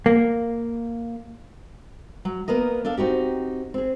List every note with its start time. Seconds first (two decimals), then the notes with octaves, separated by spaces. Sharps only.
0.06 A#3
2.25 F#3
2.48 A#3 B3 A#4 D#5
2.85 D4 A4 F5
2.97 C4 D#4 F#4 G4
3.74 C4 G#4